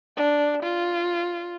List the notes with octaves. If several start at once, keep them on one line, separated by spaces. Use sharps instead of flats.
D4
F4